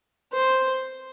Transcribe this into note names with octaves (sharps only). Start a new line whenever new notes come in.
C5